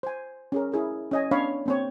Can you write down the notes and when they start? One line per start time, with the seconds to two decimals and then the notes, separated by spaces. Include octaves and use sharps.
0.03 C5 G#5
0.52 C#4 G#4 A#4
0.72 E4 G#4 A#4
1.11 C#4 D#5 G#5
1.31 B3 C#4 D4 C#5 F5 B5
1.66 A#3 C4 C#5